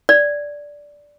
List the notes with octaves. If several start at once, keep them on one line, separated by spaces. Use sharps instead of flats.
D5